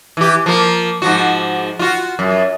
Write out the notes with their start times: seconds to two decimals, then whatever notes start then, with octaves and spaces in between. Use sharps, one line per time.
0.17 E3 G4
0.46 F3 A#3
1.02 G#2 F3 F#4
1.79 F4 F#4
2.19 F#2